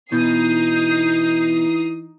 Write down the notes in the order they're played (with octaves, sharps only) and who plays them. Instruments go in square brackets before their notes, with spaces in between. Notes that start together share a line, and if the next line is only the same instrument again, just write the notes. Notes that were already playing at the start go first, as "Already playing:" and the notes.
[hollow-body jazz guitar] B2 [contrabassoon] E3 [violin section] D#4 D#6 C7 [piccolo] G6